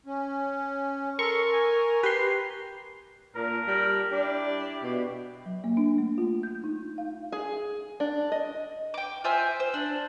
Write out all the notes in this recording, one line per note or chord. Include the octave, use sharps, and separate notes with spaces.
C#4
A4 A#4 C6 C#6
G#5
G4 B4 C6
A#2 D4 A#4
G3
D4 E4 G4
B2
F#3
A#3
D4
A3
F4
G6
D#4
F5
G#4
D4
D#5
G5 D6
F4 C5 E5 G#5
C5
D4